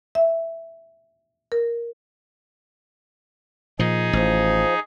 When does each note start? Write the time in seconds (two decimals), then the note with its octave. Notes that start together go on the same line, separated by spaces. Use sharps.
0.15 E5
1.52 A#4
3.79 A#2 F3 D#4 G#4
4.13 A1 F3